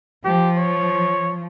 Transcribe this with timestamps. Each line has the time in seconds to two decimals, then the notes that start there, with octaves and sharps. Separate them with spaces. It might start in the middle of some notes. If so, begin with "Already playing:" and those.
0.25 F3 G4
0.57 C#5